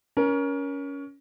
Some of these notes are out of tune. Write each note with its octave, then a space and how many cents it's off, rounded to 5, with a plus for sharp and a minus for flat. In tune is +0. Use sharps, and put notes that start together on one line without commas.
C#4 +20 A#4 +25